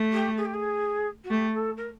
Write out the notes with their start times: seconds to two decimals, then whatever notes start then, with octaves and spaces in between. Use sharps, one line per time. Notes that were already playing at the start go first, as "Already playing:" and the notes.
Already playing: A3
0.13 G4
0.37 G#4
0.45 G4
0.53 G#4
1.24 F#4
1.30 A3 G4
1.54 A4
1.77 A#4